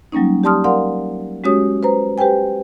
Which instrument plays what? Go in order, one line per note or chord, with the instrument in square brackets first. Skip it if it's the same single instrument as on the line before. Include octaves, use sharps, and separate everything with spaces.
[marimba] F#3 G3 A#3 C#4 D#4
G4 D5 A5 C6 D#6 F6
A#4 D5 F5 F#5 C6
G#3 C#4 F#4 G4 C#5 D#6
B4 C5 A#5
G4 B4 C5 G5 G#5